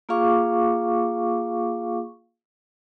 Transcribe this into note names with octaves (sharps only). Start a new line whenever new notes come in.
A#3 F4 G#4 F5 C#6 D6